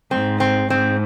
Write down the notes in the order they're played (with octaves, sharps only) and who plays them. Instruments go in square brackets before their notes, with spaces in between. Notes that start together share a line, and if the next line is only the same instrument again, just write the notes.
[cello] G#2 [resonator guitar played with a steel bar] C4
[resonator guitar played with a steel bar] C4
[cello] G#2 [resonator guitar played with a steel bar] C4